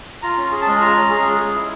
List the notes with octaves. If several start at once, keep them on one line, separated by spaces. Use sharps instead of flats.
F4 A#5
C#4 A#5
G#4
A5
G#3
F4 A#5
C#4
G#4
G#3
G#4
E4